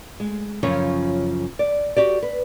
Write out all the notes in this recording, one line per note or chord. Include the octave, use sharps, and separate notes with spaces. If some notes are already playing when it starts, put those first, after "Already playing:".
G#3
F#2 C#3 F3 F4 C#5
D5
F#4 G4 D5
B4